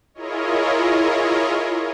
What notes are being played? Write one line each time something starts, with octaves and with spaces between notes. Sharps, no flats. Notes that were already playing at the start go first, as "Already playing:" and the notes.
E4 F4 G#4 A#4 C#5 D#5